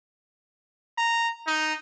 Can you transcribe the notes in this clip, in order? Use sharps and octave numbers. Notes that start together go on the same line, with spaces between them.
A#5
D#4